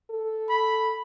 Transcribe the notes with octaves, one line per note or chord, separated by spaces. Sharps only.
A4
B5